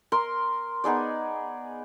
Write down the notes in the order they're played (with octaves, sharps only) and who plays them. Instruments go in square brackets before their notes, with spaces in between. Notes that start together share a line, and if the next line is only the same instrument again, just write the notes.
[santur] A#4 C6
B3 D#4 G#4 D5